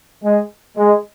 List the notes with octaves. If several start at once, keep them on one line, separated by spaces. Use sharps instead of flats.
G#3
G#3